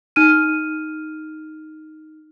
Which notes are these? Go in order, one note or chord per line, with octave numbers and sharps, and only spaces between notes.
D#4 F6 D#7